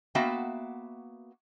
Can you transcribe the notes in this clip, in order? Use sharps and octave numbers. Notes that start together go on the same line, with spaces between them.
A#3 B3 F#4 E5 F5 G5